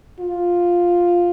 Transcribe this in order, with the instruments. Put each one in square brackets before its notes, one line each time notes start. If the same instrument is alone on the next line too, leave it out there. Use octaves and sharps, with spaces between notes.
[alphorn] F4